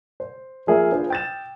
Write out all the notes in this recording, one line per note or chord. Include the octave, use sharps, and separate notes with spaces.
C5
F3 A#3 G#4 A#4 E5 G#5
D4 F4 G#4 B4 C5
G5 A6 E7